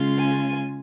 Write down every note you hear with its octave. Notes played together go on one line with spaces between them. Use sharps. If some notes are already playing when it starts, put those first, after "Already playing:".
Already playing: C#3 G#3 C#4 F4
G#5